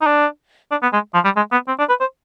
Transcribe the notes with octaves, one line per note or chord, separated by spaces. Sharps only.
D#4
D4
D4
B3
G#3
F3
G3
G#3
B3
C4
D4
B4
C5